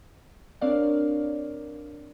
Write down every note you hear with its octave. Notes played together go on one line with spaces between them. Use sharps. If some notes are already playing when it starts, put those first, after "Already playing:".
C4 D4 A#4 C#5 D5 F5